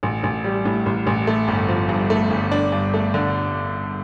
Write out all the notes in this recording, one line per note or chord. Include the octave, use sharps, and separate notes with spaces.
A1
A1
G3
A2
A1
A1
A3
G1
F3
G2
A3
G1
D4
G2
A3
D3